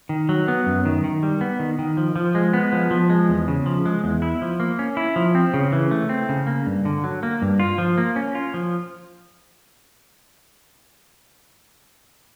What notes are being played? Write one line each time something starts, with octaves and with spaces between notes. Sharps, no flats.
D#3
F#3
B3
F#2
D#3
D#3
G3
B3
D#3
D#3
F3
F3
G#3
B3
F3
F3
G#3
E2
C#3
F3
G#3
E2
E4
F3
A#3
C#4
E4
F3
C4
C#3
E3
A3
C4
C#3
A#3
G2
D3
F#3
A#3
G2
F4
F3
A#3
C#4
F4
F3